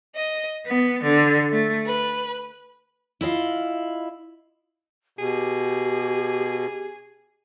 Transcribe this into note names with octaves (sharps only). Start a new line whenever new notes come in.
D#5
B3
D3
A3
B4
E4 F4 D#5 F5
B2 G4 G#4